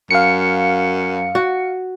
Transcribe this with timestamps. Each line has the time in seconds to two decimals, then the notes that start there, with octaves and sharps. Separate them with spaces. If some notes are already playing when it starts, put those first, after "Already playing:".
0.11 F#2 F5 C#7
1.35 F#4